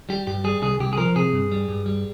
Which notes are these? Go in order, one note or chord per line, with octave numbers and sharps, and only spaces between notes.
G3 G4
G2 G4
G3 G#4
C2 G#4
C2 G4
G#4
F3 A#4
C3 G#4
G2
G3
G2
G3